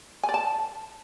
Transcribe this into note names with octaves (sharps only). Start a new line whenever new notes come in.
G#5
D5
A5